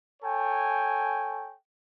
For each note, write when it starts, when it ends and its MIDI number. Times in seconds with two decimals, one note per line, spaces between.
0.23 1.53 69
0.23 1.53 73
0.23 1.53 79
0.23 1.53 80